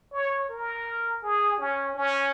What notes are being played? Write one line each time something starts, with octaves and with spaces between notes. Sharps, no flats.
C#5
A#4
G#4
C#4
C#4